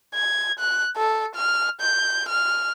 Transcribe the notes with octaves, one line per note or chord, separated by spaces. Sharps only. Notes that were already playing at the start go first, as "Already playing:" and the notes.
G#6
F#6
A4
F6
G6
F6